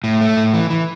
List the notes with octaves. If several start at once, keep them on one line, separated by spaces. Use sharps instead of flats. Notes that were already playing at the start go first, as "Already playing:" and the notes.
A2
A3
A2
E3
E3